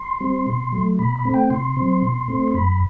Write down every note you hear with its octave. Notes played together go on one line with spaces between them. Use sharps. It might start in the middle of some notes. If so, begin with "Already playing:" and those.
Already playing: C6
G3 C4
B2
F#3 A3
B2 B5
B5
A3 C4
G5
C3 C6
F#3 C4
B2
A3 C4
C6
F#2 B5